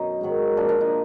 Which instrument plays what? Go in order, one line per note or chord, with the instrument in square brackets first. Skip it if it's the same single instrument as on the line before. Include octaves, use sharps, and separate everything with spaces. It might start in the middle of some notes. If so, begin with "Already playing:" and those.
Already playing: [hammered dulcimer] F#2 B2 D#4
G#2 D#3 F#3
A#2 F3 D4
D4
D#4